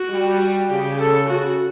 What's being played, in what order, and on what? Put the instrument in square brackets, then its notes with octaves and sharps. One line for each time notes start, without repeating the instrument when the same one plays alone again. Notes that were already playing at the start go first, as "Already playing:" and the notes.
Already playing: [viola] F#4
[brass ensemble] G3
[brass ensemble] C#3 [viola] G4
[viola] A4
[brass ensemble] C#3 [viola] F#4